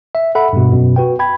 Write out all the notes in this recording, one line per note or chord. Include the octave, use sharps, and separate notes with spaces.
E5
A4 E5 F#5 B5
G2 B2
F#2 B2
F#4 B4 G5
G5 B5 G#6